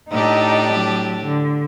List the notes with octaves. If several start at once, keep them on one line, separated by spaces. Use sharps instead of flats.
A2 D4 D#4 G4
F#3
D3